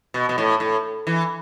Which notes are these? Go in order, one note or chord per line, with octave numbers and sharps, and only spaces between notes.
B2
B2
A2
A2
E3